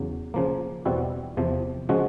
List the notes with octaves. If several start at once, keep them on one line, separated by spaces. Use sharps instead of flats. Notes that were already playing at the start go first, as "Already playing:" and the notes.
Already playing: E2 C#3 F#3
C#3 F3 A#3
E2 B2 G3 C4 E4 F#4
E2 C3 F3
C#3 F3 G#3 C#4 F#4